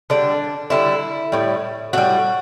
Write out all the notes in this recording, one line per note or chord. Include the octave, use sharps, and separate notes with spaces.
D3 G3 D4
D3 G3 E4
A2 G3
A2 G3 F#4